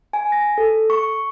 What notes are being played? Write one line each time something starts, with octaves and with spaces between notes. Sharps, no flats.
G#5
A#6
A4
C#6